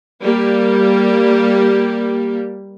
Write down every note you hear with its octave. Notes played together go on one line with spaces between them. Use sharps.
G3 A#3 G4